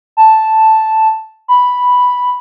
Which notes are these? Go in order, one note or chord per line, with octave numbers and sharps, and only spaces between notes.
A5
B5